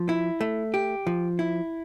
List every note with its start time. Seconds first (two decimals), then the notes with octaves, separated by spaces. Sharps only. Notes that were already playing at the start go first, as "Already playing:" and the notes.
Already playing: F3
0.09 E4
0.41 A3
0.74 G4
1.07 F3
1.39 E4